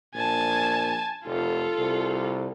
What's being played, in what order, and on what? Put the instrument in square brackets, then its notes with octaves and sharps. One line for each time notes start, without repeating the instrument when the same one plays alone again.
[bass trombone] A#1 [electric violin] G#5 A5
[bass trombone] F1 [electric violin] F4 A4
[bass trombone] C2